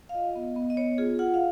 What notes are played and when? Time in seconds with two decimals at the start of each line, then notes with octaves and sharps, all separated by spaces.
0.09 F5
0.14 F4 D#5
0.35 B3
0.56 B3
0.70 D#5
0.77 B3 C#5
0.98 F4 G#4
1.19 F4 F#5
1.34 F5